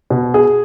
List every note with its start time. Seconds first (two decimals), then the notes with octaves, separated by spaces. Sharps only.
0.10 B2
0.34 G#4